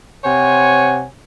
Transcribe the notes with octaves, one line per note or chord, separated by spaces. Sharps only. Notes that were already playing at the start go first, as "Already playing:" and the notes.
C3 C5 C#5 F#5 G#5